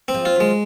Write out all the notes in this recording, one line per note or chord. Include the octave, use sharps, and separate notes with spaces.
C4
F3 G#3
F4
D#3 F#3 G#3